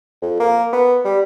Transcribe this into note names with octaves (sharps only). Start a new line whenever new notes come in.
F2
A#3
B3
G3